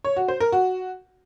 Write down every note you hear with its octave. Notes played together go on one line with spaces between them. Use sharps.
C#5
F#4
C5
A#4
F#4